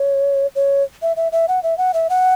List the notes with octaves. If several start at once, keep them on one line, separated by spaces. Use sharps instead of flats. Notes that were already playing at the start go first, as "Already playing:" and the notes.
Already playing: C#5
C#5
E5
E5
E5
F#5
E5
F#5
E5
F#5